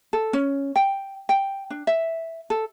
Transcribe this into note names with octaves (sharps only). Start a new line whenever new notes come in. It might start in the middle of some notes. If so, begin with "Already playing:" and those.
A4
C#4
G5
G5
D4
E5
A4